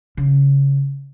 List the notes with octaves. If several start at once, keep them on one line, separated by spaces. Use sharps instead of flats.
C#3